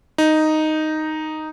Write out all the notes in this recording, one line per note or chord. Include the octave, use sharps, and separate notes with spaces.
D#4